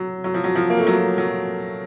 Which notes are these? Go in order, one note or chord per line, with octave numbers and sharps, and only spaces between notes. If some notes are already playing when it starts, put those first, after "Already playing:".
Already playing: F#3
F#3
F3
F#3
F3
A#3
A3
F#3
F#3